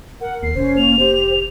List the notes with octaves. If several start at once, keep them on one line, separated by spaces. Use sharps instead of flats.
A#4 F#5
D#2 C7
F1 C#4 C5
A#3 F7
G4 C5